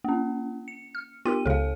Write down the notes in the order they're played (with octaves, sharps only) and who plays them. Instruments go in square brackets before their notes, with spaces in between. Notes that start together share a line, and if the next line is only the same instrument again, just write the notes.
[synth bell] A#3 C#4
C#7
[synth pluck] F6
[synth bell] B3 D#7 [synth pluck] F4 G4 A#4
[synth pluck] C#2 C#3 [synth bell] A4 F5